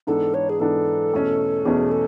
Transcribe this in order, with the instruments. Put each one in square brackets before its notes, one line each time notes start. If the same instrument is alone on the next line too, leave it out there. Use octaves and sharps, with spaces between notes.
[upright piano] G#2 E3 B3 D4 [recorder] A4
[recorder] C#5
G#4
[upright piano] G#2 E3 B3 D4 [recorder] A4
[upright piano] E2 B2 A3 C#4
[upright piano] E2 B2 A3 C#4 [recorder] G#4
[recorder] A4